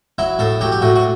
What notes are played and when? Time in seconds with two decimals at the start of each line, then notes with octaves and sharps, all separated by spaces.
0.18 F#3 E4
0.39 A2 A4
0.61 F#3 G4
0.72 G4
0.82 A2 F#4
0.96 F#4